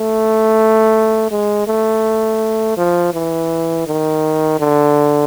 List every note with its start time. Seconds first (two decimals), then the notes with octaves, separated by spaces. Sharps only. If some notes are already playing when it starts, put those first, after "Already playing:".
Already playing: A3
1.31 G#3
1.67 A3
2.77 F3
3.14 E3
3.87 D#3
4.60 D3